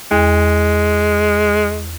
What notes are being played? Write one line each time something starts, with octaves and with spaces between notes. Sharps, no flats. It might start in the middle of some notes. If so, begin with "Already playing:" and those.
E2 G#3